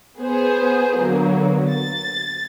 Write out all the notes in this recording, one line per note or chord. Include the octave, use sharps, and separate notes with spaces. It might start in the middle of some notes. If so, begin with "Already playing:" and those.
B3 G#4 C5
D3 F#3 A#3 B3
A6